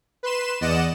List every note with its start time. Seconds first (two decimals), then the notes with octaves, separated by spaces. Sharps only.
0.23 B4 C6 E7
0.61 E2 D5 D#5 F#5 E7